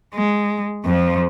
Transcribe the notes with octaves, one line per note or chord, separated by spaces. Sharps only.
G#3
F2 F3